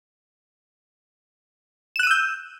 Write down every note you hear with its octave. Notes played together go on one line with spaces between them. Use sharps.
E6 F#6 G6 D#7 E7